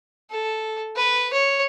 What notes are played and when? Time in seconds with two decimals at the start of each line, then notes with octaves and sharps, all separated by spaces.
0.31 A4
0.97 B4
1.33 C#5